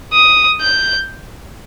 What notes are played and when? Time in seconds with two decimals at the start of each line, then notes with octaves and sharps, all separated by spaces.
0.13 D#6
0.61 G6